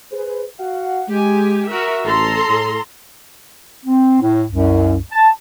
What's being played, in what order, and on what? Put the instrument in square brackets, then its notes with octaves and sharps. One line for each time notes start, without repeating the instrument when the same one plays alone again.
[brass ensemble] G#4 B4 C5
F#4 F5 F#5
[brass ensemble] G#3 [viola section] G4 G#5
[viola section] F#4 A#4 E5
[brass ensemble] A1 [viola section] A4 A#5 C6
[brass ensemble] A2
[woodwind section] C4
A2
C2 F#2
A5